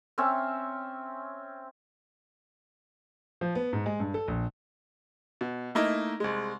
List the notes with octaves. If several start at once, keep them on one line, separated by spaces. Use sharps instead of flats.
C4 C#4 E5
F3
B3
G#2
G#3
G2
A4
A#1
B2
A3 A#3 D#4 E4
C2 G#3